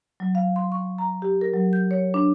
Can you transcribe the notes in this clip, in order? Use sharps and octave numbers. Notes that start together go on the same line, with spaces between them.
F#3
F5
C6
C#6
A#5
G4
A#4
F#3
G6
C#5
D4